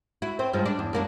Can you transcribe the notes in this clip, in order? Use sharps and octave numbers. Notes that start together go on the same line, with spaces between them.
E4 F#4
C4 C5
G2 F3 G#3
D4
E2
F#2 A#3 D4